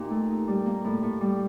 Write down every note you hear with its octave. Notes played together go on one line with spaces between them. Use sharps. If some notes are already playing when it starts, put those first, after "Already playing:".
Already playing: A#2 D#4 G4
A3
D#4
G3
A#3
A2
A2
G3